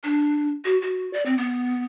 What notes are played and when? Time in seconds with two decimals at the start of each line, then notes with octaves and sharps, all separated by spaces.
0.04 D4
0.65 F#4
0.81 F#4
1.13 D5
1.26 C4
1.38 B3